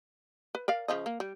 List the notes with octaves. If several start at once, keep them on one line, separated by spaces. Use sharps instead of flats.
B4
A#4 D5 F5
C#3 F3 D#5
A#3
G3